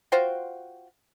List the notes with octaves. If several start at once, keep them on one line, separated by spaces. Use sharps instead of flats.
F4 F#4 C5 G5